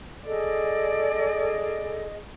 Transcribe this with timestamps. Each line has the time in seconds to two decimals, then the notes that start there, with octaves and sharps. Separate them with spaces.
0.26 G#4 A4 D5 D#5